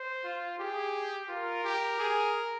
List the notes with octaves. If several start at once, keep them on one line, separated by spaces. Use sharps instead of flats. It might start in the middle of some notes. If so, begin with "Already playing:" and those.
Already playing: C5
F4
G4 G#4
F4 A#4
G4
G#4